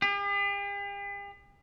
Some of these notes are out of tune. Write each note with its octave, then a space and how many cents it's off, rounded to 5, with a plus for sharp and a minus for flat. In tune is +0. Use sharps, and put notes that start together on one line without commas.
G4 +45